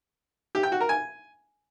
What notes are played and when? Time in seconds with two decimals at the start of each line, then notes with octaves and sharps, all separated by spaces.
0.55 G4
0.63 G5
0.72 F#4
0.80 A#4
0.89 G#5